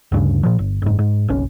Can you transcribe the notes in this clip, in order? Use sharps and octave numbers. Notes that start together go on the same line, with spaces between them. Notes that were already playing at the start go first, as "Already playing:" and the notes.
D2 G2 C#3
A#2 F3
G1
F#1 G#2
G#2
F#1 B1 C#4